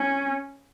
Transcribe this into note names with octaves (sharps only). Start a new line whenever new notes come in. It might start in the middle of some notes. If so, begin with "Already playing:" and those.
Already playing: C#4